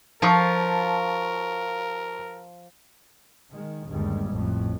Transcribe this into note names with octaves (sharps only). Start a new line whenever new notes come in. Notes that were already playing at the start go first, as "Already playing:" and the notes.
F3 F4 A#4 A5 C#6
D#3 G#3
G1 D#2 G3 G#3
A1 F2 A2